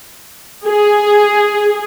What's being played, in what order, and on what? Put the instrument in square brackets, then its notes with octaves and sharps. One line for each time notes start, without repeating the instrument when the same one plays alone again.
[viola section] G#4